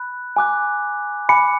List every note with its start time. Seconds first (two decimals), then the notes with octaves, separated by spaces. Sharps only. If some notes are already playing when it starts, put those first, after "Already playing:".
Already playing: B5 F#6
0.36 G#5 D6 F#6
1.29 G#5 B5 D6 C#7